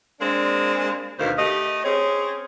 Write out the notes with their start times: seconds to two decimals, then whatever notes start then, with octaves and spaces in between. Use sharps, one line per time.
0.20 G#3 A#3 C4 D4
1.19 D2 B2 D#3 C5 F5
1.38 A3 G4 D#5
1.84 C4 C#4 G#4 C#5